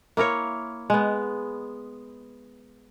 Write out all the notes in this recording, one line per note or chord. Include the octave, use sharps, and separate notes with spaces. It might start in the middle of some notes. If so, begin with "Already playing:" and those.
A#3 E4 A#4 C#5
G#3 B3